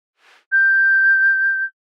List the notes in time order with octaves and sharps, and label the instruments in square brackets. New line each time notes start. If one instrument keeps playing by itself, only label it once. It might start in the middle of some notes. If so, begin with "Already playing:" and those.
[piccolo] G6